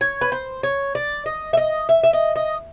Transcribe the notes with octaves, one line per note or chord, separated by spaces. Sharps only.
C#5
B4
C5
C#5
D5
D#5
E5
D#5
E5
E5
D#5
D#5